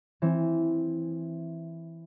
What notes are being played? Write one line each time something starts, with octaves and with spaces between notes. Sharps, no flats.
E3 C4